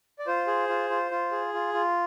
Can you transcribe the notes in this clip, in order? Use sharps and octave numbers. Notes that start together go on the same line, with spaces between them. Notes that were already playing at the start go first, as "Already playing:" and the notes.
D5
F4 C5
G#4
F4
F4
F4
G#4
F4
F4